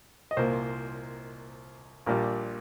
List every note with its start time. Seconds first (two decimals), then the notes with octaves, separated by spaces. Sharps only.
0.31 D#5
0.37 C2 A#2 A#3 C5
2.06 A#1 A#2 G3 A#4